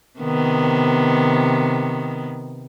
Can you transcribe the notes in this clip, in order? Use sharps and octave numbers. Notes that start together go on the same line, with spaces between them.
C3 D#3 B3